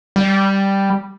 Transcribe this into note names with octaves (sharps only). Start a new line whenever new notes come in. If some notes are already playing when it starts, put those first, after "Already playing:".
G3